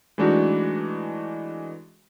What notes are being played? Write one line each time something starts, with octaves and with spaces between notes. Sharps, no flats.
E3 G#3 A3 D4 D#4 F#4